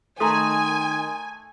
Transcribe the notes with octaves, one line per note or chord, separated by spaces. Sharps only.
D#3 A3 G#5 A#5 C6 D#6